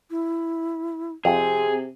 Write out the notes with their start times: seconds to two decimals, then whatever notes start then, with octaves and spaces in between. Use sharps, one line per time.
0.10 E4
1.25 F2 C3 C4 G#4